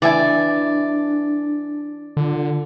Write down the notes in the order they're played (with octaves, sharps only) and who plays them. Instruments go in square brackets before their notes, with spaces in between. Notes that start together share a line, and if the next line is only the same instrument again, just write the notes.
[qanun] E3 D6 [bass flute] D4 [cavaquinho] D5 E5 G#5
[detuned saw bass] D3 [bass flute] F4